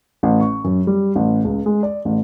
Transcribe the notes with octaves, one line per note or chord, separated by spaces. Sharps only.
A1
C#6
F#2
G3
A1
C#2
G#3
D5
A1